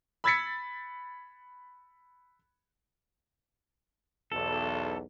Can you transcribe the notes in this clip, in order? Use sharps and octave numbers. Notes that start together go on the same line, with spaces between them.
B5 E6 G#6 A6 B6 C#7
B1 E2 A4